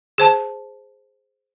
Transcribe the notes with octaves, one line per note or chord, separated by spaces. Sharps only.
G#4 C5 A5